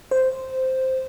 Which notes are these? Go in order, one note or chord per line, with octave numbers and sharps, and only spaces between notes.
C5